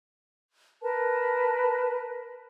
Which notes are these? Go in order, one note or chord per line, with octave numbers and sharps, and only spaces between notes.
A#4 B4 A5